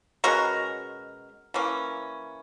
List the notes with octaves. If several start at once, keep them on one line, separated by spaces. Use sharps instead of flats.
B2 G#3 C#4 F#4 A#4
E3 A#3 C#4